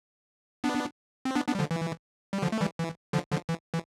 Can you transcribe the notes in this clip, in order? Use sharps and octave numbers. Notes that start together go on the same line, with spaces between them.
B3 D4
C4
B3 D4
B3 D4
G3
D3 F3
E3
G3
D3 F3
A3
E3 G3
E3
D3 F3
D3 F3
E3
E3